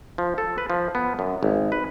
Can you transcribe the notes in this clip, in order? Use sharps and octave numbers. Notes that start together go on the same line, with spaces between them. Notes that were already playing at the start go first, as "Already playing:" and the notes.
F3
A4
B4
F3
B3
F#2
G#1
B4